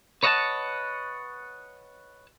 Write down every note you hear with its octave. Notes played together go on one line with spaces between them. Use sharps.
B4 C#5 D#5 F5 F#5 A5